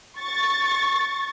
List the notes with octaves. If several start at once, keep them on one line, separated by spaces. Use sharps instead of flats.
C#6 A6